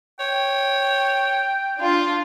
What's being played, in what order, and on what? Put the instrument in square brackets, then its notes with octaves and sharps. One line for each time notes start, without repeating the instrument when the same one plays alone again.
[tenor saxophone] C#5 [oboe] G5
[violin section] D4 F4